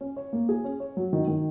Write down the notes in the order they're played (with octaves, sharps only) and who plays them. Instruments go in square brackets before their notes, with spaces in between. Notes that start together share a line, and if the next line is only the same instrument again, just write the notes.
[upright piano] C#4
C#5
A#3
G#4
C#4
C#5
F#3
D#3
D#3